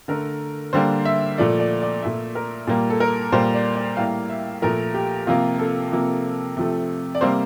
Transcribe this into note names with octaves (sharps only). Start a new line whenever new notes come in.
D3 A3 A#4
D3 G3 A#3 C5
E5
A#2 F3 A3 D5
D5
D5
A#2 A3 E5
A#4
A#2 G3 A#3
A4
A#4
A#2 G3 A#3 C5
D5
D5
A2 G3 A#3 F5
E5
A#2 F3 A3 A#4
G4
C3 F3 A#3 F4
A4
C3 F3 A#3
C3 F3 A3
D5
C3 G3 A#3 C5